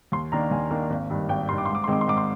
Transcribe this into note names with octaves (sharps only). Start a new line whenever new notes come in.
D#2 C6
D#3 A#3 D4 A#5
D#2 G#5
D#3 A#3 D4
G#1
G2 D#3
G#1 G5
G2 D#3 C6
D6
G#2 C6
D6
C6
D#3 G#3 C4 D6
C6
G#2 D6
C6